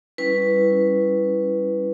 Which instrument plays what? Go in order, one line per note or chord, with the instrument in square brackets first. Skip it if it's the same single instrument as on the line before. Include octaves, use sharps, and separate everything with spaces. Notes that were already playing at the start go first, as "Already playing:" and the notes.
[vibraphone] G3 C#4 E4 B4